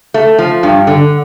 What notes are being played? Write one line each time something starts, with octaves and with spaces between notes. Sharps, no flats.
A3
F3
G2
D3